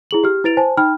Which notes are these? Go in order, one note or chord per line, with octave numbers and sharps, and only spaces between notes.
E4 G#4 F#7
G4 F6
E4 B4 A6 D7 F7
C5 G#5 A5
D#4 G5 B5 F6